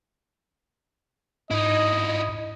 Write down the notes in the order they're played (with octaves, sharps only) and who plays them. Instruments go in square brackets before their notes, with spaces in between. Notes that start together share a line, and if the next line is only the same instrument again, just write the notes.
[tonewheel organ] G#2 [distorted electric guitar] D#4 E4 [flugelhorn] D#5